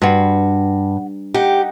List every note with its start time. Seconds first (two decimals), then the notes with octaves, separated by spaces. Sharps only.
0.02 G2 F#4 B5 C6
1.34 D#4 G4 F#5